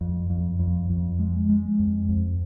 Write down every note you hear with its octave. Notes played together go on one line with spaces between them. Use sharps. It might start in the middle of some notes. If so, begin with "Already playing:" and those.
F2
F2
F2
F2
G#3
G#3
F2
F2